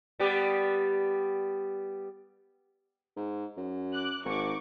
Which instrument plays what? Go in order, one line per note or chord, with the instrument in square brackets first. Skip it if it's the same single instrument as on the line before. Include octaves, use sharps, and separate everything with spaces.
[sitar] G3 B3 G4
[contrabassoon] G#2
F#2
[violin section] D6 F#6
[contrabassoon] G#1 [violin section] D#4 C#6 D6